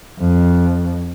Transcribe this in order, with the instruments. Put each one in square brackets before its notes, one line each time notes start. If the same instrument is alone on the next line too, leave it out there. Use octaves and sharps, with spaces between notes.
[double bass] F2